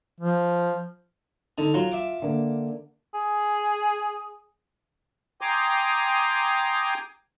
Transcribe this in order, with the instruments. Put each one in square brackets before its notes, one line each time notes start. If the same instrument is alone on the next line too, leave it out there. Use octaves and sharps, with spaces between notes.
[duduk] F3
[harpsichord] D3 [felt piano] D#4
[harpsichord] F#3 [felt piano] F4
[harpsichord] E5 D6
[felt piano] D3 A#3
[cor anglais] G#4
[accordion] G5 G#5 A#5 C6 D6 D#6